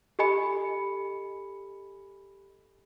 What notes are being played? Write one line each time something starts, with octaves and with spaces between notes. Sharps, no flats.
G4 A4 D#5 G#5 B5 C#7